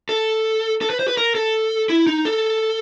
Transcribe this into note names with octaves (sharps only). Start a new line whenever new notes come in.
A4
A4
B4
C5
B4
A#4
A4
E4
D#4
A4